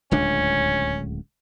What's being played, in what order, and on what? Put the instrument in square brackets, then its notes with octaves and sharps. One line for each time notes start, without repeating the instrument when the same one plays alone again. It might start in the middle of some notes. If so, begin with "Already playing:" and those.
[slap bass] D1 C#2 D4 [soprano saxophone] C#4